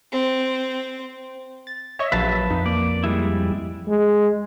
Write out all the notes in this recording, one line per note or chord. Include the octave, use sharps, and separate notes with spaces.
C4
A6
C#5 D#5 E5 C#6
A#1 F#3 B4 F5 A5
F2 D#4
A#3 D5
G3 G#3 E4
G#3